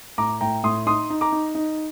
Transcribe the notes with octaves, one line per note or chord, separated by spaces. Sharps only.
A2 A#5 D6
A2 G5 A#5
A2 C6 D#6
D#4 C6 D#6
D#4
A#5 D6
D#4
D#4